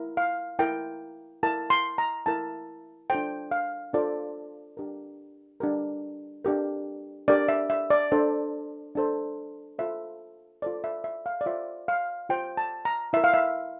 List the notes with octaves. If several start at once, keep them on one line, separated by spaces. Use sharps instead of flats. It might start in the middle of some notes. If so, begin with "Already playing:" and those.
Already playing: E4 A#4
F5
E4 A#4 G5
E4 A#4 A5
C6
A#5
E4 A#4 A5
D4 F4 A4 C5 G5
F5
D4 F4 A4 C5 D5
D4 G4 A#4
D4 G4 A#4
D4 G4 A#4
D4 G4 A#4 D5
E5
E5
D5
D4 A4 C5
D4 A4 C5
F4 A4 C5 E5
F4 A4 C5 D5
E5
E5
F5
D5
F4 C5 E5
F5
F4 C5 G5
A5
A#5
E4 A#4 E5
F5
E5